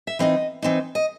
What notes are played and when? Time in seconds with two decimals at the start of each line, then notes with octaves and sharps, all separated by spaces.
0.07 E5
0.19 E3 C4 D#4 D#5
0.62 E3 C4 D#4
0.95 D#5